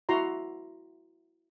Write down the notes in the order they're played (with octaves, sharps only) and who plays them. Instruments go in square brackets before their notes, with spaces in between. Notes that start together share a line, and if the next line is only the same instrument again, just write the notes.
[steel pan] E4 F#4 A#5 C6